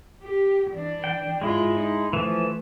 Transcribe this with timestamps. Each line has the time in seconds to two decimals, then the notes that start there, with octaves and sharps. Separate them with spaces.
0.23 G4
0.71 E3 D4
1.04 G5
1.42 G#2 G#3 E4 F4
1.75 D#4
2.13 E3 F3 A3